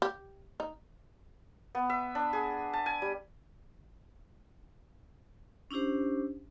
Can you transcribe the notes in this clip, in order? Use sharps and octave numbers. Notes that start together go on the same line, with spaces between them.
G4
D#4
B3
E5
D4
G#4
A5
G#5
G3
C#4 D4 E4 G4 C5